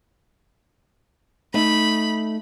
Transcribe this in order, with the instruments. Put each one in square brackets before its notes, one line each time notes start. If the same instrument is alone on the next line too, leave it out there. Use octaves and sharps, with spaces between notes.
[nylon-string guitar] A3 D#4 [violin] B5